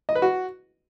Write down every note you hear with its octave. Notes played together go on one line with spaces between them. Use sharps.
D#5
B4
F#4